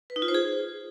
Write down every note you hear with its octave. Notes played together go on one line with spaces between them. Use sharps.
B4
D#4
F4
C5
G#4